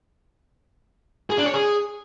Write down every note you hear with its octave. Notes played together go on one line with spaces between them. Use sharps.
G#4
D4
C#5
G#4